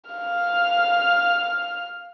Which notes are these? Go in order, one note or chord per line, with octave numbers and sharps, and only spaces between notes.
F5 F6